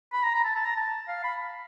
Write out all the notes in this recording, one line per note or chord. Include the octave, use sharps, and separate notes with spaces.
B5
A#5
A#5
A5
A5
A#5
A5
F5
B5